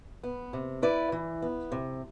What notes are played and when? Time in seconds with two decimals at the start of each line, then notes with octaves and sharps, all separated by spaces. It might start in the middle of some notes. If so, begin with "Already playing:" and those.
0.23 B3
0.53 C3
0.82 E4 B4 D5
1.12 E3
1.42 B3
1.72 C3